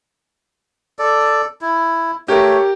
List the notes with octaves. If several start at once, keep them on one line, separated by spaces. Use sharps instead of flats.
A4 D5
E4
A3 G4 A#4 C#5